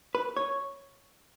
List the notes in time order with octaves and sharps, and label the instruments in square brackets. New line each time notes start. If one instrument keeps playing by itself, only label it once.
[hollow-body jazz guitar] B4
C#5